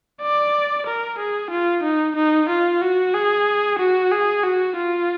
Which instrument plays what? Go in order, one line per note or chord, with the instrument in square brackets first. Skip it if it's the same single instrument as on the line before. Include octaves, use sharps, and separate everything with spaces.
[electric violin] D5
A#4
G#4
F4
D#4
D#4
F4
F#4
G#4
F#4
G#4
F#4
F4